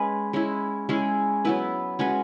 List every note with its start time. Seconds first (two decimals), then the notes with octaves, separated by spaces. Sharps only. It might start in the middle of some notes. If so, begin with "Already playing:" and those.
Already playing: G#3 C#4 G#4 B4
0.33 G#3 C#4 E4
0.89 G#3 C#4 E4 G#4
1.45 F#3 B3 E4 B4
1.99 G#3 C#4 F#4 B4